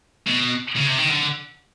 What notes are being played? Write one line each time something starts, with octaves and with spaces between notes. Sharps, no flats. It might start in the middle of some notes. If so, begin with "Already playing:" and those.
B2
C#3
C3
D#3
D3